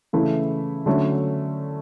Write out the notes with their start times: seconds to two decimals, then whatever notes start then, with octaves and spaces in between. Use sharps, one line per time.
0.13 C#3 E3 A3 E4
0.86 D3 F#3 A3 C#4